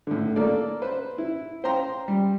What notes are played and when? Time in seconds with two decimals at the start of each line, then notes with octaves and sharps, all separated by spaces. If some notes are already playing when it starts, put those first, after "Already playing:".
0.07 A2 D3
0.36 A#3 A4 D5
0.82 B4 C5
1.18 E4
1.64 C5 F5 G5 A#5 C6
2.08 G3